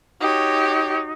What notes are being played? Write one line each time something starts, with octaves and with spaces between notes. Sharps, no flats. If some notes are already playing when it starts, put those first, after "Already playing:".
D#4 F#4 G4 C#5